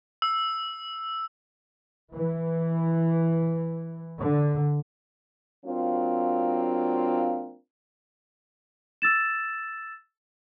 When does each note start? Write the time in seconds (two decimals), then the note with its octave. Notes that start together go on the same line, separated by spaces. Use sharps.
0.22 E6
2.14 E3
4.20 D3
5.65 F#3 A#3 C4 D4 F4
9.02 E6 A6 E7